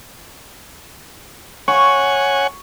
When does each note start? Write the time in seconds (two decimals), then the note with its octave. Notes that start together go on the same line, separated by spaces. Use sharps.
1.68 C#5 F#5 G#5 C#6